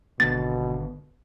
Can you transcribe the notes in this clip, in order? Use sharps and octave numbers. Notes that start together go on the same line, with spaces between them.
G#1 B2 D3 B3 A6